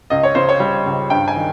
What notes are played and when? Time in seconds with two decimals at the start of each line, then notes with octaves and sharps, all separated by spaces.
0.10 C#2 D#5
0.23 C#5
0.35 C#3 C5
0.49 C#5
0.60 G3
0.86 C#2
1.10 G2 G5
1.28 G#5
1.36 D#3